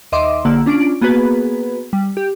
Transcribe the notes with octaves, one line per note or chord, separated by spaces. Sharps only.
D#2 D#5 E5 C6 D6
A#1 D3 A#3 F#5 E6
C#4 D4 F4 D7
A#3 B3 F#4 G#4 B4
G3
G4